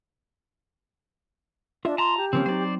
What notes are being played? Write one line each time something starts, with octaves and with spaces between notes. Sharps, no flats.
D4 F4 D#5 E5
A5 A#5 C6
G4
C#3 F3 A#3 C4 C#4
F#3 C4 D#4 C5 D5